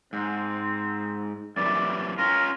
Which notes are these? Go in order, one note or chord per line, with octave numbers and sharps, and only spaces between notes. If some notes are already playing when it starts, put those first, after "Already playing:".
G#2 C4
F#2 E3 G3 D5
C#4 F4 A#4